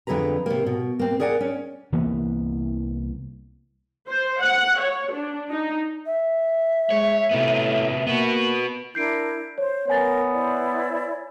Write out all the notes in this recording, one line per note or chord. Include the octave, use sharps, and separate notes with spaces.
F2 D3 E3 G#4 B4 A#5
C3 A#3
B2
A#3 C4
G#4 A#4 D5 F#5 G#5
C#4
C2 E3 A#3 B3
C5
F#5
C#5
D4
D#4
E5
G#3 C#5
A2 C3 B3
A#3 B3 F#4
D4 E4 A#4 G6 C7 D7
C5 C#5
B3 A#4 C#5 G#5 A6
E4 C5 D5